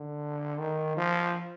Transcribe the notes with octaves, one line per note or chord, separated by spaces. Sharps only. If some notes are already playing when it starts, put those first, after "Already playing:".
Already playing: D3
D#3
F3